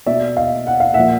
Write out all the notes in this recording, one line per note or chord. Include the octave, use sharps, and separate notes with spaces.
B2 D5 E5
D#5 F5
F#5
F5
A#2 F3 E5 F#5